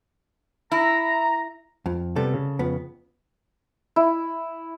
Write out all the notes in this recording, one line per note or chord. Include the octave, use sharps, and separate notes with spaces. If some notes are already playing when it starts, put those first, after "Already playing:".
E4 A#5
F2
C3 G3 B3 A4
C#3
F2 B3
E4